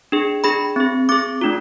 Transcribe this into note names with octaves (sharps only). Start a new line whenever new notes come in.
D4 G#4
D4 G#4 B5
C4 G#4
C4 G#4 D6
A3 D4 F4